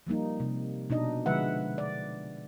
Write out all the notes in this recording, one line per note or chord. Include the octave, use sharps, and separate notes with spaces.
F3 G3 A#3 D#4
C3
B2 D4 D#4 D#5
D3 F3 G#3 B4 E5 F#5
D5